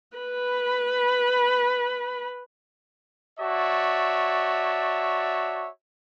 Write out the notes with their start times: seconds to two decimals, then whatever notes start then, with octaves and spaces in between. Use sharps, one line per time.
0.17 B4 B5
3.40 F#4 C#5 D5 E5 A5